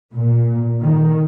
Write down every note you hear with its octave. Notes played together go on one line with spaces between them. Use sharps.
A#2
D#3